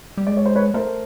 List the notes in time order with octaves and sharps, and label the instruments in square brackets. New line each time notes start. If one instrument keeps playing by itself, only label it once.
[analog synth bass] G3
[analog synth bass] G#3 [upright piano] D5
[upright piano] C#5
C5
B4 C#5
[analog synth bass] A3 [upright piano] A#4 C5